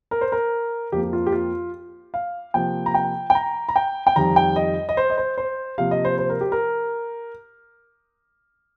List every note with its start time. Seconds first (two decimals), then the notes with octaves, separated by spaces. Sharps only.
0.11 A#4
0.21 C5
0.32 A#4
0.92 F2 F3 A#3 G4
1.03 G4
1.13 F4
1.27 G4
1.33 F4
2.14 F5
2.54 C3 F3 A#3 G5
2.86 A#5
2.94 G5
3.30 G5
3.35 A#5
3.69 A#5
3.76 G5
4.07 G5
4.16 F2 D#3 G3 A#5
4.36 G5
4.56 D#5
4.89 D#5
4.97 C5
5.10 D#5
5.17 C5
5.38 C5
5.78 C3 F3 A#3 F5
5.91 D#5
6.05 C5
6.18 C5
6.30 A#4
6.41 G4
6.52 A#4